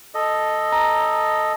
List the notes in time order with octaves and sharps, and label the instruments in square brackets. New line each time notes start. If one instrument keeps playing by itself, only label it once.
[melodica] A4 D#5
[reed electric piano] A#5